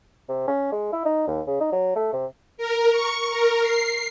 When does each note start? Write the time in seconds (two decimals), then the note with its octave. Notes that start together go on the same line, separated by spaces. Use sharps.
0.29 C3
0.47 C#4
0.72 G#3
0.93 E4
1.05 D#4
1.27 D#2
1.47 C#3
1.60 D#4
1.72 F#3
1.96 A3
2.13 C3
2.57 A#4
2.92 C#6
3.30 A#4
3.62 C7